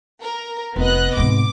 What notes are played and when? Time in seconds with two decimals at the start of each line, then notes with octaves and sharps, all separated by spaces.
0.22 A#4
0.76 F1 B3 D#5 F#6
1.17 G#2 C3 D6